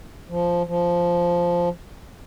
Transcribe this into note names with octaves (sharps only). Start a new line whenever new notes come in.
F3
F3